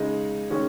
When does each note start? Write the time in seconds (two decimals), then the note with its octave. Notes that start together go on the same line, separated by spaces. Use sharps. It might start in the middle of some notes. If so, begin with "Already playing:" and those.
Already playing: C#3 G#3 D#4 G#4
0.50 D#3 G#3 C#4 G#4